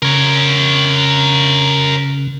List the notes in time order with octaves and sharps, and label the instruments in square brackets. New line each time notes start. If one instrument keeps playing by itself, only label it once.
[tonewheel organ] C#3 [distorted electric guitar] A#4 C#5